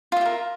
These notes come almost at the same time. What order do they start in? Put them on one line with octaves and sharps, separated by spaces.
F4 E5 G4 A#4